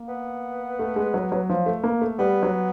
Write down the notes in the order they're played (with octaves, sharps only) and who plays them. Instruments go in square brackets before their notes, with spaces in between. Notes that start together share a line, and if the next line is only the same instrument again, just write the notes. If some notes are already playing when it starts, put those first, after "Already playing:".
Already playing: [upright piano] A#3
[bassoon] B3
[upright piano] A3
G#3
F#3
F#3
F3
A3
A#3
A3
[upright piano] G3 [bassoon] B3
[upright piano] F#3